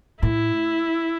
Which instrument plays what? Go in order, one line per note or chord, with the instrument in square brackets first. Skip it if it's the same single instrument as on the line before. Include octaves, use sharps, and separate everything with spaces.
[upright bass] A2 [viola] E4